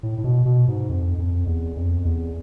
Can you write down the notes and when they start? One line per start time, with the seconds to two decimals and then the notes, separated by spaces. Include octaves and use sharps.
0.03 A2
0.18 A2
0.24 B2
0.46 B2
0.68 G#2
0.89 F2
1.18 F2
1.47 E2
1.77 F2
2.05 E2